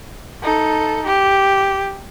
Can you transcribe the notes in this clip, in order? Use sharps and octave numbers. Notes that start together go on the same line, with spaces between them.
D#4 A4
G4